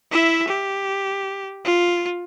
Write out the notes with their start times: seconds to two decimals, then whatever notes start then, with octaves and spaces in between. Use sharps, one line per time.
0.12 E4 E5
0.48 G4
1.65 F4